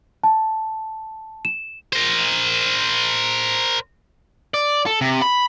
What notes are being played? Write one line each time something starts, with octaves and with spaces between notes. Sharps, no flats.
A5
E7
A#4 C5
D5
A4
C3
B5